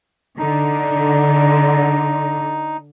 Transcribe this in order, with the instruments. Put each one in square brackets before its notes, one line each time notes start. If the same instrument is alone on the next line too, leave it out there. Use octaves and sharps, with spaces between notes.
[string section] D3 [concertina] D#4